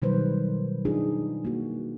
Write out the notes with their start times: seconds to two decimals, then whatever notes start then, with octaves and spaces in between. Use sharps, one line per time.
0.02 B2 D#3 F#3 G3 B4 C5
0.85 D4 D#4 F4 G#4
1.45 A#3 F#4